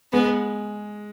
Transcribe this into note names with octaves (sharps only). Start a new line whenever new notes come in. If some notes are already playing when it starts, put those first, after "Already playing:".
G#3 B3